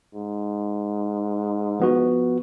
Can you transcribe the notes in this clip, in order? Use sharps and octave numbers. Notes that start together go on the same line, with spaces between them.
G#2
F3 B3 F#4